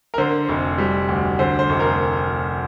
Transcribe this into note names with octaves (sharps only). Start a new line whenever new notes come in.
A#4
D3 C5
F1
G3
D2
D3 C5
C5
F1
A#4